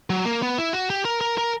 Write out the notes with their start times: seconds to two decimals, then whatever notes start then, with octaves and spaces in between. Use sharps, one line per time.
0.10 F#3
0.25 A#3
0.42 B3
0.58 E4
0.73 F#4
0.90 G4
1.05 A#4
1.21 A#4
1.38 A#4